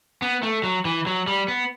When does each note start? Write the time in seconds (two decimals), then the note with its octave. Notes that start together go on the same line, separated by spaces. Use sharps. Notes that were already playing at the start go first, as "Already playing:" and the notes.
0.22 B3
0.43 A3
0.64 F#3
0.85 E3
1.07 F#3
1.27 G3
1.48 B3